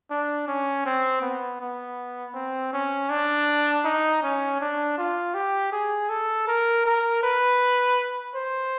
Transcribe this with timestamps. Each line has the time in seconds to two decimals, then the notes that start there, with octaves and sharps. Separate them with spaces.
0.10 D4
0.48 C#4
0.85 C4
1.22 B3
1.60 B3
2.34 C4
2.73 C#4
3.10 D4
3.84 D#4
4.23 C#4
4.61 D4
4.98 F4
5.34 G4
5.72 G#4
6.09 A4
6.48 A#4
6.86 A#4
7.23 B4
8.35 C5